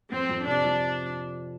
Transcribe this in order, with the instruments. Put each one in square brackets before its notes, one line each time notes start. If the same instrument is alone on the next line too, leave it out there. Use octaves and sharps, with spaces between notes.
[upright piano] F2 [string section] C4
[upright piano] F2
[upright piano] C3 [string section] D4
[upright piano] F3